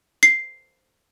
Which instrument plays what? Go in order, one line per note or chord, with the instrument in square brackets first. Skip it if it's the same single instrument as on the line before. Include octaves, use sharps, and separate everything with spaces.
[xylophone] C7